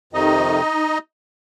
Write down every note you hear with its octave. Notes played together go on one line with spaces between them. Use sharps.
F2 C3 D#3 D#4 D#5